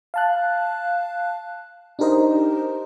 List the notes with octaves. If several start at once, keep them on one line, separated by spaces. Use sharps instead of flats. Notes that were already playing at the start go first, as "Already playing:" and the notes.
F5 A5 F#6
D4 D#4 G4 A#4 C5 D#5